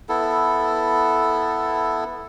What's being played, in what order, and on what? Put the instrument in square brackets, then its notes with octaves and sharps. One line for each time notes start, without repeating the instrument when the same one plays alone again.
[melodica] B3 E4 A4